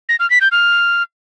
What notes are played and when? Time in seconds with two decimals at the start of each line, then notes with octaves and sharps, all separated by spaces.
0.09 A#6
0.20 F6
0.30 B6
0.41 G6
0.52 F6